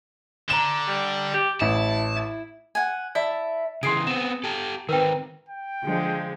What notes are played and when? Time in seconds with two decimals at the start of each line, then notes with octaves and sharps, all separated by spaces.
0.50 D3 A#5 E7
0.88 G3
1.34 G4
1.61 A1 E4 A5
2.16 E4
2.75 F#5 G#5
3.15 E4 D5 E5 A5
3.83 C#3 E3 G#4 C6 C7 D7
4.07 B3 C4 E7
4.44 G4 A4
4.89 D#3 C4 A#4 B4 G5
5.49 G5
5.83 D3 F3 G#3